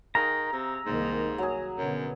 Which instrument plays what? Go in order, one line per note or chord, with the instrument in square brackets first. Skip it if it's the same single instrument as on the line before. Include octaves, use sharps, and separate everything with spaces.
[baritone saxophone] D#3 [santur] G#4 F5 [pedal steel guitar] A#5
[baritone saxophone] C3 [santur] E6
[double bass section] C2 D#3 A#3 [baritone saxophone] G#2
[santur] F#3 G#4
[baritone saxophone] F#2 [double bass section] B2 D3 B3